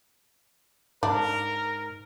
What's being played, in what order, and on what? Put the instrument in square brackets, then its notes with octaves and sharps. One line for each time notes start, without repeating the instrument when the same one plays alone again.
[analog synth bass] G#2 [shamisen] D4 [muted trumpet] A#4